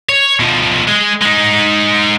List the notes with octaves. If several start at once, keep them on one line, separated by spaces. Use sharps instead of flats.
C#5
B2 F3
G#3
G#3 D#4